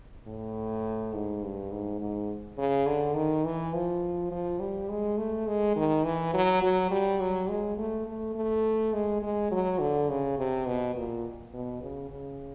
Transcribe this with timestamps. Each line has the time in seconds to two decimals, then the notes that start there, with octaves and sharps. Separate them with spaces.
0.27 A2
1.13 G#2
1.43 G2
1.72 G#2
2.00 G#2
2.58 C#3
2.87 D3
3.15 D#3
3.44 E3
3.74 F3
4.31 F3
4.60 G3
4.89 G#3
5.18 A3
5.47 G#3
5.76 D#3
6.04 E3
6.33 F#3
6.62 F#3
6.91 G3
7.20 F#3
7.49 G#3
7.78 A3
8.07 A3
8.35 A3
8.93 G#3
9.22 G#3
9.51 F#3
9.80 D3
10.09 C#3
10.38 C3
10.66 B2
10.95 A#2
11.53 B2
11.82 C#3
12.10 C#3